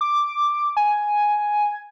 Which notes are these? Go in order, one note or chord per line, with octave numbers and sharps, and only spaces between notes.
D6
G#5